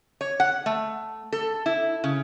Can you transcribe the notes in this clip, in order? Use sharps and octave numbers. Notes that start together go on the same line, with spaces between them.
C#5
F#5
A3
A4
E4
C#3